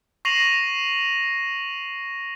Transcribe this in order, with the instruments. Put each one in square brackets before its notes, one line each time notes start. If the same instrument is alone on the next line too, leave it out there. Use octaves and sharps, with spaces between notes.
[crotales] C#6 A#6 C7 D#7 F7 F#7